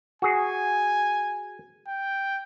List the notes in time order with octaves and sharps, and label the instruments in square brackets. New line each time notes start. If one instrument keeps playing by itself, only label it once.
[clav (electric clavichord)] F#4 G#4 [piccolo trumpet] G#5
[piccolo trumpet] G5